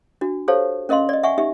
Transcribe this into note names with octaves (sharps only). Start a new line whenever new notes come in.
D4 F#4
G4 A4 C5 C#5 F5 A5
C#4 A#4 D#5 F5 C6
D5 D#5
E5 F#5 G#5 C#6
D#4 G4 E5